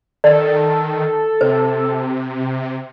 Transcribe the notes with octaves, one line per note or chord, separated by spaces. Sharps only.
D#3 A4 D5
C3 C5